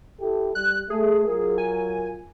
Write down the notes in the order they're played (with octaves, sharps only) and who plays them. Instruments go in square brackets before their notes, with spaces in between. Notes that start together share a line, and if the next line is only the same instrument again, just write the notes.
[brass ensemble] E4 G4 A4
[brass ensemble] G3 [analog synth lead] F#6
[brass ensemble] A3 [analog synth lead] G#4
[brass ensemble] F#3 F4 A#4
[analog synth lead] G#5